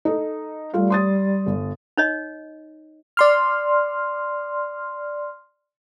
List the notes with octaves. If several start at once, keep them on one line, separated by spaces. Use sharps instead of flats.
D#4 A4
G3 A3 F4 F5
C6 D#6 A6
G1
D#4 C#5 D#5
D5 C6 F6